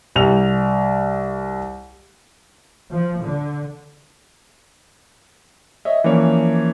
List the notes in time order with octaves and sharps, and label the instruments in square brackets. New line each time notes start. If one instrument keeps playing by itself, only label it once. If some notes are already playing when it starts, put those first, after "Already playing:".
[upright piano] C2 F7
[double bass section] F3
D3
[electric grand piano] C#5 D#5 E5
E3 F3 A#3 C#4 C#5 D5